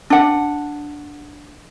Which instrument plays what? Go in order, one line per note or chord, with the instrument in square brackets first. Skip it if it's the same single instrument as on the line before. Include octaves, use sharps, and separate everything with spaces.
[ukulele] D4 F#5